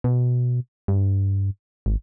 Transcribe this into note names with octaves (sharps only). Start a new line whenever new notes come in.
B2
G2
G#1